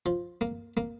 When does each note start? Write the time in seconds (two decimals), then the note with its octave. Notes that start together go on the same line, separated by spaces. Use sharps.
0.06 F3
0.41 A#3
0.77 A#3